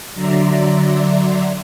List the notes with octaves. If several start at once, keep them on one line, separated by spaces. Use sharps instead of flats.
D3 F#3 D5 E5 A#5 C6